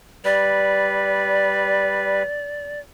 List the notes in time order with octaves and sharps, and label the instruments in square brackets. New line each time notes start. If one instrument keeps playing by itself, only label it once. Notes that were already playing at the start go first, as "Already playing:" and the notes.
[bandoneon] G3 B4 [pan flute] D5